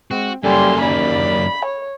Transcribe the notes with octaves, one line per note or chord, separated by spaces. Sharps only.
G#3 C4 F#4
F#2 G3 A#3 A4 G#5 C6
D#2 D5 B5
C#5